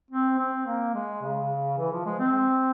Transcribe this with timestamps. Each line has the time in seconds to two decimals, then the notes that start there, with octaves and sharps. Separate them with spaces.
0.11 C4
0.39 C4
0.67 A#3
0.94 G#3
1.22 C#3
1.78 E3
1.92 F3
2.06 G#3
2.19 C4